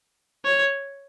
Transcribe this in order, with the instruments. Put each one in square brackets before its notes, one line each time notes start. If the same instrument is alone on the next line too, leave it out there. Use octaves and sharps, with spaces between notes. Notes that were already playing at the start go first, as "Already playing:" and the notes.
[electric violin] C#5